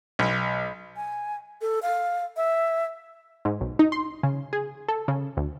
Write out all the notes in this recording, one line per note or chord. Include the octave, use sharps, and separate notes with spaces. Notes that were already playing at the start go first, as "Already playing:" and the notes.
B1
G#5
A4
F5
E5
G#2
B1
D#4
C6
C#3
G#4
A4
C#3
D2